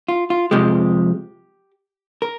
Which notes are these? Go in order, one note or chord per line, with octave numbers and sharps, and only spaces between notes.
F4
F4
F2 C3 F3 G#3 G4
A#4